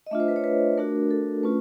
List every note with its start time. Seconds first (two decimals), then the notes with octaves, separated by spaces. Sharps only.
0.07 D#5
0.11 A3 D4 F4 E5
0.20 C5
0.28 B4
0.36 C#5
0.44 B4
0.78 A3 D4 F#4 A#4
1.11 A4
1.43 A3 C#4 F4 B4